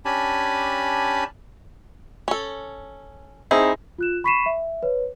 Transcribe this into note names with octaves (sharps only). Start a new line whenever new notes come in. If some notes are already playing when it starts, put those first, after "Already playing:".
C#4 D4 G4 G#5 A5 B5
C#4 A4
C4 D#4 E4 G#4
F4 F#6 E7
B5 C#6 B6 C7 D#7 E7
E5
B4 C#5